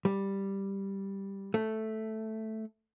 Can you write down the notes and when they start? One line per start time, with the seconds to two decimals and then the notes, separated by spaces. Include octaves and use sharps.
0.05 G3
1.54 A3